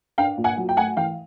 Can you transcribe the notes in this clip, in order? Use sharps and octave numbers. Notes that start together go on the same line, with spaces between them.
D4 F5 G5
A#2
F#5 G#5
F#3
G5
A3 F#5 G#5
E3 F5 G5